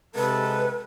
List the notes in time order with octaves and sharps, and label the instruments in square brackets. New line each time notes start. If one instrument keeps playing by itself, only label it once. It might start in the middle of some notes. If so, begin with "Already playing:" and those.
[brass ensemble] C3 G#3 A4 [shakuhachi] B4